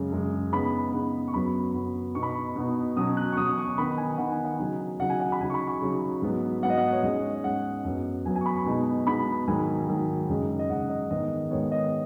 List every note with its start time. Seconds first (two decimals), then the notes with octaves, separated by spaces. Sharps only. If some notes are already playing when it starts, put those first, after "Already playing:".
Already playing: F#2 C#3 G#3
0.12 F#2 C#3 G#3
0.52 C#3 B3 D#4 B5
0.93 C#3 B3 D#4
1.28 C#6
1.34 F#2 F#3 B3 B5
1.74 F#2 F#3 B3
2.15 B2 B3 D#4 C#6
2.23 B5
2.29 C#6
2.56 B2 B3 D#4
2.97 B2 F#3 C#4 D#6
3.17 F#6
3.32 C#6
3.37 B2 F#3 C#4 D#6
3.58 C#6
3.78 D#3 B3 D#4 B5
3.98 G#5
4.18 D#3 B3 D#4 F#5
4.32 G#5
4.45 F#5
4.59 C#3 F#3 D#4
5.00 C#3 F#3 D#4 F#5
5.10 G#5
5.20 F#5
5.32 B5
5.41 C#3 F#3 D#4 G#5
5.50 C#6
5.54 B5
5.67 C#6
5.81 C#3 F#3 D#4
6.22 G#2 F#3 B3
6.63 G#2 F#3 B3 F#5
6.70 D#5
6.78 F#5
6.92 C#5
7.03 G#2 G#3 C#4 D#5
7.35 D#5
7.44 G#2 G#3 C#4 F#5
7.85 F#2 F#3 B3
8.25 F#2 F#3 B3 G#5
8.35 G#5
8.41 C#6
8.46 B5
8.56 C#6
8.66 B2 G#3 B3 D#4
9.07 B2 G#3 B3 D#4 B5
9.47 G#2 D#3 F#3 G#5
9.89 G#2 D#3 F#3
10.28 F#2 C#3 G#3 D#4
10.59 D#5
10.70 F#2 C#3 G#3 D#4 F#5
10.90 D#5
11.10 G#2 D#3 G#3 B3 D#5
11.50 G#2 D#3 G#3 B3 C#5
11.72 D#5